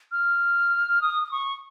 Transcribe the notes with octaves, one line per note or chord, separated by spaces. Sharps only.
F6
D#6
D#6
C#6